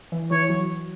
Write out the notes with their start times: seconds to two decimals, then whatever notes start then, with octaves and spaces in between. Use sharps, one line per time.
0.12 E3
0.31 E3 C#5
0.49 F#3